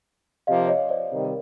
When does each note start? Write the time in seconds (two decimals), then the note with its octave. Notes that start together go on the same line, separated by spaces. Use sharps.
0.47 C3 F3 A#3 D#5 F5
0.68 C#5 D#5
0.89 C5 D5
1.11 C3 D#3 G3
1.25 A#4